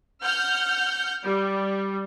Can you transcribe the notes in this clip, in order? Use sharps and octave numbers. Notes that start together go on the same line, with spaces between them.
F#5 F6 G6
G3